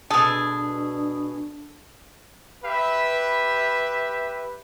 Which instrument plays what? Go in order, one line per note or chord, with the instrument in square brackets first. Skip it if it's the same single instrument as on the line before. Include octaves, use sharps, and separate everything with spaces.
[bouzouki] B2 G#4 [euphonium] D4 [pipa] A4
[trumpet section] G4 B4 E5